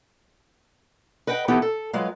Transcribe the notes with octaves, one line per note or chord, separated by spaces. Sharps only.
B4 D#5 F#5 G5
E3 B3 D#4 E4 G4 A4
A4
F#3 G#3 F4 B4 F5